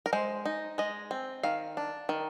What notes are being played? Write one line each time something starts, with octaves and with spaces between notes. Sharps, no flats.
A#4
G#3 C5
D#4
G#3 D#5
C4
D#3 F5
D4
D#3